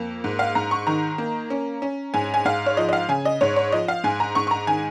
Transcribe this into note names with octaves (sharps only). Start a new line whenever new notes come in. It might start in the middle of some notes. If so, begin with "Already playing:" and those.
Already playing: F2 A#3
G#2
F5
G#2 A#5
C#6
D#3 A#5
A#3
C#4
C#4
G#2 G#5
G#5
G#2 F5
C#5
F3 D#5
D#5
F5
C#3 G#5
D#5
G#2 C#5
C#5
F3 D#5
F5
G#2 G#5
A#5
G#2 C#6
C#6
A#5
D#3 G#5